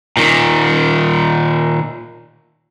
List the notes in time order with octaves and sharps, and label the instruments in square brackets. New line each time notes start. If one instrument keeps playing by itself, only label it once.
[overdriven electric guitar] A#2 D#3